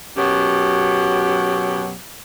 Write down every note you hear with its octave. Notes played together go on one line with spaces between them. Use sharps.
F#2 B2 F#3 G4